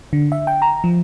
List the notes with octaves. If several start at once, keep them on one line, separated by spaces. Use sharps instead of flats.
D3
E5
G5
A#5
F3